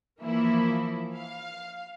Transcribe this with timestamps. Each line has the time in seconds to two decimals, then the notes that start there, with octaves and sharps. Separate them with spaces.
0.22 E3 F3 A#3 E4
1.16 F5